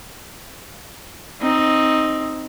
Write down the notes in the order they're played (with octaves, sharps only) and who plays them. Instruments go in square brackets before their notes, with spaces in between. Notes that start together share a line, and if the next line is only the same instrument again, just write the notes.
[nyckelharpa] C4 D#4